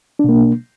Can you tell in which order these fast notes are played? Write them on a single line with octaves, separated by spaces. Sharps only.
D4 B2 A#3